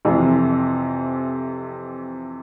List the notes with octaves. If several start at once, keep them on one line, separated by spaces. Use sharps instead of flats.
F2 C3 E3